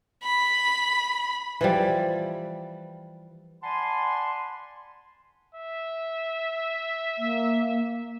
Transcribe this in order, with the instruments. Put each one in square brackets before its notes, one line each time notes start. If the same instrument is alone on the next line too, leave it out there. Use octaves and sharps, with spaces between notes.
[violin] B5
[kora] E3 F3 G3
[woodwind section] D5 F#5 G#5 A5 B5 C6
[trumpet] E5
[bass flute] A#3